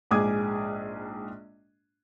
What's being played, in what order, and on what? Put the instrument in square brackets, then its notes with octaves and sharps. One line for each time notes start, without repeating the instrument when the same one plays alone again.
[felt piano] A#1 G#2 G#4 D6 D#6 G#6